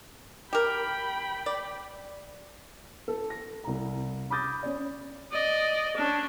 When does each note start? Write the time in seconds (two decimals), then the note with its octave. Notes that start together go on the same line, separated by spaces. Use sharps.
0.53 G4 A#4 G5 B5
1.46 D5
3.08 A4
3.30 A#6
3.64 C2 A#5
4.30 B5 D6 D#6 G6 A6 A#6
4.63 C#4 D5
5.32 D5 D#5
5.97 C#4 D4